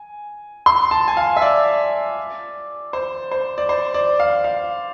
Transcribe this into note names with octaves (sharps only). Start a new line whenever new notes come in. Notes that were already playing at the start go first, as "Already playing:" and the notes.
Already playing: G#5
C6
A5
G#5
F5
E5
D5
C5
C5
D5
C5
D5
F5
F5